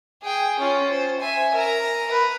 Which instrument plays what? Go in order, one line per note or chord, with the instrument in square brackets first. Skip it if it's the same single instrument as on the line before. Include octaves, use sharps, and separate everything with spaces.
[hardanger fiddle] G#4 G5
C#4 F4
C5
E5 G#5
A#4 A#5
A#4 B4